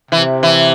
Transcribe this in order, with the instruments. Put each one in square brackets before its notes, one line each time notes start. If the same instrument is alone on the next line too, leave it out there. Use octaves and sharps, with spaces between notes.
[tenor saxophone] C3 [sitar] E3
[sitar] E3